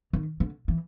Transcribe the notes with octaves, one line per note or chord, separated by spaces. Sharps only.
D#3
D3
E3